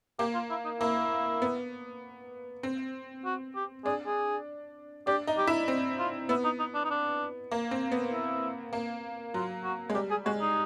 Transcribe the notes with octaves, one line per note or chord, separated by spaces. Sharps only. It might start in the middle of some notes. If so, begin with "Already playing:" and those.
A#3 G4
F4
E4
D#4
A#3 E4
B3
C4
F#4
G4
D4 G#4
G#4
D4 G4
D#4
G4
E4
C4
F4
B3 E4
D#4
D#4
D4
D#4
D4
A#3
C4
B3
E4
A#3
F#3 F4
F#4
G#3
G3 G4
G#4
G#3 F#4
D#4